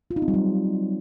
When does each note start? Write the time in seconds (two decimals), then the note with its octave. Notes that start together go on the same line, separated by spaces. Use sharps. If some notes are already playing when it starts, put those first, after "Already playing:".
0.11 F4
0.16 D#4
0.22 C4
0.28 G3
0.34 F#3